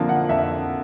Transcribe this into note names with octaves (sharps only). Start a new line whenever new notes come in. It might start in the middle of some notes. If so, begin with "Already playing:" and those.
Already playing: F2 D3 F3 A#3 F5
F#5
F2 E5